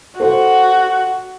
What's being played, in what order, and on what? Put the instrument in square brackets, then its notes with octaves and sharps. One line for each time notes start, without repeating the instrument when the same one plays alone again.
[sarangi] F#4 [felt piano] A4 C5 F#5